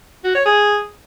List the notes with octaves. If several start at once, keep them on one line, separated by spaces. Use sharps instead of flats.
F#4
C#5
G#4